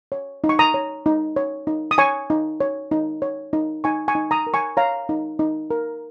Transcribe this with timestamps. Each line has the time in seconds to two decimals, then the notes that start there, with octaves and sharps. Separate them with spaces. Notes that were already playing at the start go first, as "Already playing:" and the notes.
0.12 C#5
0.44 D#4
0.49 C#6
0.59 A#5 D#6
0.74 C#5
1.06 D#4
1.36 C#5
1.67 D#4
1.91 D#6
1.98 C#5 G#5 C#6
2.30 D#4
2.60 C#5
2.91 D#4
3.22 C#5
3.53 D#4
3.84 D#4 G#5 C#6
4.08 G#5 C#6
4.15 D#4
4.31 A#5 D#6
4.47 A#4
4.54 G#5 C#6
4.77 C#5 F5 A#5
5.09 D#4
5.39 D#4
5.71 A#4